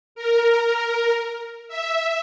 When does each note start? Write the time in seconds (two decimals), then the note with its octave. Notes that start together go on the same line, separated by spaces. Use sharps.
0.15 A#4
1.68 E5